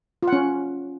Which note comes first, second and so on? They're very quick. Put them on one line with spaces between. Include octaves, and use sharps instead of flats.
F4 F#5 C#4